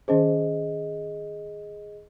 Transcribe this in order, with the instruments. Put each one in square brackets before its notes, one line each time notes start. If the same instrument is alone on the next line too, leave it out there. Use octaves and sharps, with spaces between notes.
[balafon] D#3 C#4 C5 [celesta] G#4 D#5